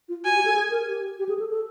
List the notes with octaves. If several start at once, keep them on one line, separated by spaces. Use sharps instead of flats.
F4
F#4 G#5
G4
A4
G#4
A#4
G4
G4
G#4
A4
A4